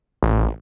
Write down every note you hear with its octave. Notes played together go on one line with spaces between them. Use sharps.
A1